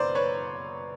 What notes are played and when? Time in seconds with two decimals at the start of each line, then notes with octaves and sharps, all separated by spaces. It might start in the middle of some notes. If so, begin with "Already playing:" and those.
Already playing: F#1 F#2 B4 C5 D5
0.15 B4 C#5